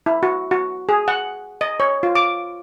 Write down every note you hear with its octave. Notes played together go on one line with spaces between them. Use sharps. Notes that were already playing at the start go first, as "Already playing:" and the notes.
E4
F#4
F#4
G#4
F#5
D#5
C#5
F4
D6